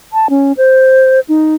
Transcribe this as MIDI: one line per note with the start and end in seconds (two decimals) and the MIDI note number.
0.13 0.29 81
0.30 0.52 61
0.57 1.20 72
1.29 1.55 63